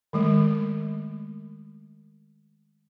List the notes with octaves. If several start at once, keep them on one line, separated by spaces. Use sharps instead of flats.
D#3 G#3 A3